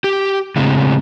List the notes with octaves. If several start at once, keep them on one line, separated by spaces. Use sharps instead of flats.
G4
A2 C#3 G#3 C4